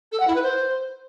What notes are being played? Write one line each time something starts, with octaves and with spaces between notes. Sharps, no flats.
A4
F#5
E4
B4
C5